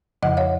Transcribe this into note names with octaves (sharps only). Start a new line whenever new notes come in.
F2 C#3 F3 D#5 F#5
C#5 F5